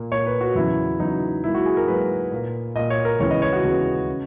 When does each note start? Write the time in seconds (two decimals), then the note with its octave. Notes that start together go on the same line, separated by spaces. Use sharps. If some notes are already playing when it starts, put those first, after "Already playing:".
Already playing: A#2 A#3
0.12 A#2 A#3 C#5
0.26 B4
0.41 F#4
0.55 E2 C#3 F#3 B3 E4
1.00 E2 C#3 F#3 B3 D#4
1.44 G#2 F#3 A#3 E4
1.55 F#4
1.66 G#4
1.77 A#4
1.88 G#2 F#3 A#3 B4
2.32 A#2 A#3
2.75 A#2 A#3 D#5
2.90 C#5
3.05 A#4
3.20 D#2 C#3 E3 G#3 B3 C#5
3.31 D#5
3.42 C#5
3.53 F#4
3.64 D#2 C#3 E3 G#3 B3
4.10 C#3